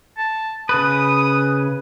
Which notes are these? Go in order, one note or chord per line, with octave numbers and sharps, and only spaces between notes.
A5
C#3 B4 D#6